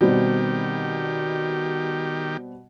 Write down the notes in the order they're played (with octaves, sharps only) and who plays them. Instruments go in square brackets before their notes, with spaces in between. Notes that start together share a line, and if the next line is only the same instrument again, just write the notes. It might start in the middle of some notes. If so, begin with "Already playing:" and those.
[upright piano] B2 G3 C4 [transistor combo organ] D#3 G4